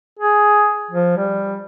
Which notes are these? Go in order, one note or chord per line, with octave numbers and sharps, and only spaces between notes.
G#4
F3
G3